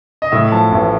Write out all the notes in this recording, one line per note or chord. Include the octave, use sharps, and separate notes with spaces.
D#5
A2 E5
F3 A5
A1